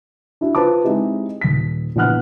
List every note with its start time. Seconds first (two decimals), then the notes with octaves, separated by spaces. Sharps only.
0.41 D4 E4 F#4
0.55 F4 B4 C5 A5 D6
0.84 G#3 C4 D#4 E4 G4
1.41 D#1 B6
1.96 A#1 E3 B3 F#5 F6 F#6